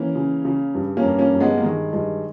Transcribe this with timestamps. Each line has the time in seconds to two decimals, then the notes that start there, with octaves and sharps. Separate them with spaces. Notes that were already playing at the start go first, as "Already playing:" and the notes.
Already playing: E3 A#3 C#4
0.15 C#3
0.45 C#3
0.75 G2
0.97 A#3 C#4
1.04 G2
1.19 A#3 C#4
1.34 G2
1.40 G#3 B3
1.58 A#3
1.63 D#3 G#3
1.93 G2 G#3